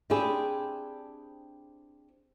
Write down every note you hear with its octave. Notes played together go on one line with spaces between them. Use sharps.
C4 D4 E4 G4 G#4